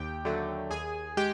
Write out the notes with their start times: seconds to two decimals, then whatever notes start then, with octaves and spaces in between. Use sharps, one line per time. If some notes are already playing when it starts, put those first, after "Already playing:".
Already playing: D#2 G4 G5
0.25 D3 F#3 A3
0.70 D#2 G#4 G#5
1.17 G#3 G4 G5